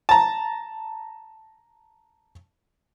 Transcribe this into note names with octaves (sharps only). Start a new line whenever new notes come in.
A5 A#5